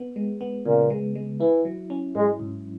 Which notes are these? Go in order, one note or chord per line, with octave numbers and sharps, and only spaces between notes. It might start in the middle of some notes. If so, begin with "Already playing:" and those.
Already playing: B3
G#3
B3
A#2 C#3
G#3
G#3
E3 E4
F#3
C#4
G#2 G#3
G#2